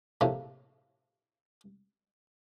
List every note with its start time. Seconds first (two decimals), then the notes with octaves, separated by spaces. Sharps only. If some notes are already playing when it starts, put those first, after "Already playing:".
0.21 A#1 A2 C3 A#3